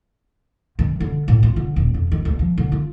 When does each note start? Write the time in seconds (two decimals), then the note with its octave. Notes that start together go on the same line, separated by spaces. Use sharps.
0.79 D#3
1.00 D3
1.28 A2
1.43 F4
1.56 D3
1.76 D#1
1.94 F2
2.12 D#3
2.25 D2
2.39 F3
2.58 D3
2.72 F4